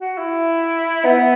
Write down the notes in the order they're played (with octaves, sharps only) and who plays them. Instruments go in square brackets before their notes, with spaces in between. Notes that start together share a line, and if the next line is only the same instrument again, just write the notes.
[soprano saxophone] F#4
E4
B3